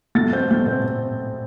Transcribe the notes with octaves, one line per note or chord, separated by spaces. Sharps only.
A3 A6
C4 G6
A3 G6
C4